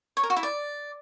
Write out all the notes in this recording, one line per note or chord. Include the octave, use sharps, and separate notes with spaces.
C#5
A#4
F#4
E4
D5